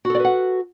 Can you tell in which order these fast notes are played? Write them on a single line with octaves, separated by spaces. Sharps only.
F#4 A4 D5 B4 F#5